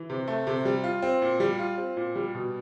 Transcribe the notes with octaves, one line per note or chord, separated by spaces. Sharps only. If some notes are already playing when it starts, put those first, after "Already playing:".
Already playing: E3
C3
A3
C3
G3
F4
C4
A#2
G3
F4
C4
A#2
G3
B2